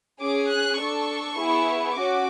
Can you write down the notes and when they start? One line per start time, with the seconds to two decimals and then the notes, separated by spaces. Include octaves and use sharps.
0.21 C#4 G#4 D6
0.51 F#6
0.80 D4 A4 C#6
1.38 B3 E4 G#4
1.97 C#4 F#4 D6